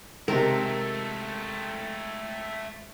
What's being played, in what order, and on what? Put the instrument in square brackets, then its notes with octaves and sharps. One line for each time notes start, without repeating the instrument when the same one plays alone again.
[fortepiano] C3 D#3 [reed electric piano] G#3 [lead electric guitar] A3 C4 [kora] A#4